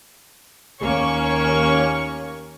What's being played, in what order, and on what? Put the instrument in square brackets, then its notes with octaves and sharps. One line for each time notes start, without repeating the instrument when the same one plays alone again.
[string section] D#2 A#3 C#4 C#5 C#6